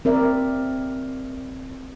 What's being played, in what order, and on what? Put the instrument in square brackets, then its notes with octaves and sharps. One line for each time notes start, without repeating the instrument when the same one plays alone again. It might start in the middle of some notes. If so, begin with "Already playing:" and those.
[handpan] C4 A#4 D5 E5